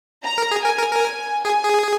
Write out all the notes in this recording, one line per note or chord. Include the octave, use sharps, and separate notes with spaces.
A#5
A#4
G#4
A#4 G#5
A#4
A#4
G#4 G#5
G#4